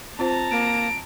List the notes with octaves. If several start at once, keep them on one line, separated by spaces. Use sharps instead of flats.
C4 F4 C5 A5 A#5
A#3 D7